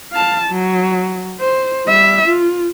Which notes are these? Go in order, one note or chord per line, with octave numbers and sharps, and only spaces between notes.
F5 A5
F#3
C5
G3 E5
F4